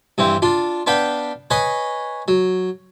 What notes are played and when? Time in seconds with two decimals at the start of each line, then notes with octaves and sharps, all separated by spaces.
0.18 G2 E3 C4
0.42 D4 F4
0.87 B3 D4 B4 F5 G5
1.50 B4 C#5 D#5 G#5 B5
2.28 F#3